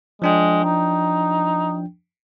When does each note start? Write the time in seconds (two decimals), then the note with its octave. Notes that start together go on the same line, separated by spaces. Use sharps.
0.22 F3 G#3 D4 G5
0.64 D#4